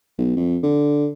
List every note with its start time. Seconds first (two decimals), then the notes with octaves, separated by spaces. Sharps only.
0.18 B1
0.37 F2
0.63 D3